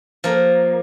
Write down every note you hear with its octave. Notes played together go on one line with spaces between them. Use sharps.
F3 A#3